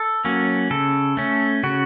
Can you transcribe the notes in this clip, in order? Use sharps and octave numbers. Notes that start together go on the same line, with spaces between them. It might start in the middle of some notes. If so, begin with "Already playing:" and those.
Already playing: A4
F#3 A#3 C#4
C#3 A4
A3 C#4
C#3 F#4